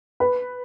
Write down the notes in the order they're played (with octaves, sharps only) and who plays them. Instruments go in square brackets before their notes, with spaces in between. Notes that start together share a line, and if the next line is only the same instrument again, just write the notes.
[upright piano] B4